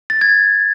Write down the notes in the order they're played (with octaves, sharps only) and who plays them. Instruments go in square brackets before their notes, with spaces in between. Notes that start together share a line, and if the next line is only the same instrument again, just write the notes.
[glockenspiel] A6
G#6